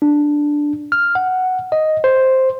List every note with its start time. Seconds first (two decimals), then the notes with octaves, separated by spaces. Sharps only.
0.02 D4
0.92 F6
1.15 F#5
1.72 D#5
2.04 C5